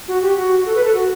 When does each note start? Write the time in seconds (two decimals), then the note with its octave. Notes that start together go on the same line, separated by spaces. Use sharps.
0.08 F#4
0.22 G4
0.37 F#4
0.66 A4
0.75 B4
0.84 A4
0.95 F#4